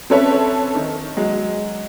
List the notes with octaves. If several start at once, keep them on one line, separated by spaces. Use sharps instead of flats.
C4 C#4 A4 B4 C#5 E5
D#3
F#3 G#3